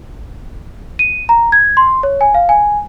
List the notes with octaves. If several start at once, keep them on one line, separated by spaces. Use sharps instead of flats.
D#7
A#5
G#6
C6
C#5
G#5
F5
G#5